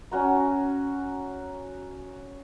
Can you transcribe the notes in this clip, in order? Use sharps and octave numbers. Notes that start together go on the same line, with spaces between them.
C#4 F#4 A#5